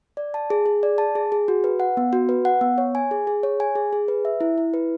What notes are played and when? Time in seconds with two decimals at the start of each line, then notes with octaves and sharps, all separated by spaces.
0.17 D5
0.34 A5
0.50 G#4
0.66 G#4
0.83 D5
0.98 A5
1.15 G#4
1.32 G#4
1.48 F#4
1.64 B4
1.80 F#5
1.97 B3
2.13 F#4
2.29 B4
2.45 F#5
2.61 B3
2.78 C#5
2.95 G#5
3.11 G#4
3.27 G#4
3.43 C#5
3.60 G#5
3.75 G#4
3.93 G#4
4.08 B4
4.25 E5
4.41 E4
4.58 E4
4.74 B4